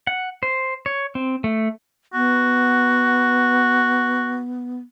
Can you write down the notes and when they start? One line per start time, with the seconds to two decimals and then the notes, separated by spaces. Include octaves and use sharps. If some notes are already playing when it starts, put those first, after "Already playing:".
0.07 F#5
0.43 C5
0.86 C#5
1.15 C4
1.44 A3
2.14 B3 F#4